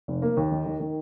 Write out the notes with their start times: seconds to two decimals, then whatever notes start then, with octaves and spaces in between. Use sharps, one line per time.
0.08 F1
0.22 A#3
0.37 D#2
0.52 D#3
0.66 D#3
0.80 D#3